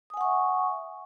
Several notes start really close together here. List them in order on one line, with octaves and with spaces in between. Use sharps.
D#6 G#5 F#5 C#6 E5